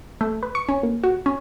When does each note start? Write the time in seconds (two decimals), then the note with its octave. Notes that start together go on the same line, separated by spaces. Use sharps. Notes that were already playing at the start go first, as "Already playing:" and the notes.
0.21 A3
0.43 B4
0.55 C#6
0.69 C#4
0.83 A#3
1.04 F#4
1.26 C#4